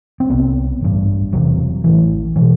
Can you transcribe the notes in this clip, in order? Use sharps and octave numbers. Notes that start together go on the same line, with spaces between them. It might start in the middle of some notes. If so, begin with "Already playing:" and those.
C4
C2 C3 B3
A1 G2
E1 E2 C3 F#3
A1 A2 E3
B2 E3